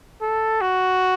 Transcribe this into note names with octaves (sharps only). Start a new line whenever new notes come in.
A4
F#4